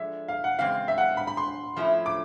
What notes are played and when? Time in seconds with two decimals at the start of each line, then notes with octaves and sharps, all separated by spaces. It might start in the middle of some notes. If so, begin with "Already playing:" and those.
Already playing: D3 F3 G#3 E5
0.28 F5
0.44 F#5
0.59 E2 C#3 G#3 C4 F5
0.88 E5
0.98 F#5
1.17 B5
1.27 B5
1.37 C6
1.76 F3 A3 C#4 E4
2.06 D6